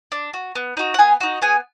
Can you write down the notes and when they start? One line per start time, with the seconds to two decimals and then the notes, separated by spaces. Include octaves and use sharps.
0.12 D4
0.34 F#4
0.55 B3
0.77 D#4 F#4
0.94 F#5
0.99 B3 G#4 G#5
1.20 D#4 F#4
1.42 B3 G#4 G#5